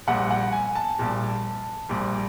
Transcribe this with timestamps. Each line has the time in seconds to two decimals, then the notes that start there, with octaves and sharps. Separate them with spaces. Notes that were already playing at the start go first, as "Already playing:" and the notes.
0.07 A#1 A#2 G3 F#5
0.31 F#5
0.53 G#5
0.75 A5
0.98 A#1 A#2 G3
1.89 A#1 A#2 G3